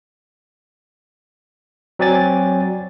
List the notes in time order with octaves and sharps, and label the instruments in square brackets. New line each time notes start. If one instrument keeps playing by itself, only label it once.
[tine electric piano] F#3 C4 D5 G#5 A6